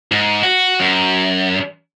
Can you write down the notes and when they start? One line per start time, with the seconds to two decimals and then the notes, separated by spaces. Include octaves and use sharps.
0.12 G#2
0.43 F#4
0.80 F#2